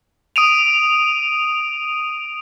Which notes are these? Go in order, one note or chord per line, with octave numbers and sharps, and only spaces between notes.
D#6 D7 D#7 F7